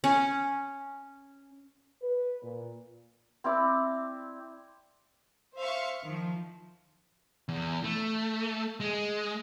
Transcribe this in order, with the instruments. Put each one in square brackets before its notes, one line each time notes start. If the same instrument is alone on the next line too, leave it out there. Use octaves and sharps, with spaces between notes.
[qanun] C#4
[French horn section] B4
A#2
[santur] C4 E4 D5
[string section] C5 E5 F5 C6 C#6
D#3 F3
[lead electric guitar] E2
A3
G#3